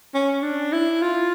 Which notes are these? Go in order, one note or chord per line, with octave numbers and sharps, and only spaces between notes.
C#4
D4
E4
F4